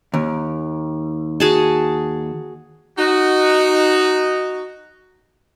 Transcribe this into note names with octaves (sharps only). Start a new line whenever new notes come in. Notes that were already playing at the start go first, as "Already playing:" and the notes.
D#2
F#4 G#4 A5
D#4 F#4